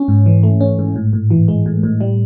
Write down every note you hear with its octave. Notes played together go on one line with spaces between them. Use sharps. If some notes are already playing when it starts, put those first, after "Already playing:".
Already playing: C#4
G#2
E3
A3
C#4
G#2
A2
A2
E3
G#3
A2
A2
G3